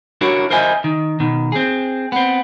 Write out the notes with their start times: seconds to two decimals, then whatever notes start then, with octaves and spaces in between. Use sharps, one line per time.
0.21 D4 E4 F#4 A#4 C#5
0.50 A#4 C5 D#5 E5 G#5
0.84 D#3
1.20 B2 D#3
1.52 C4 G#4
2.12 B3 C4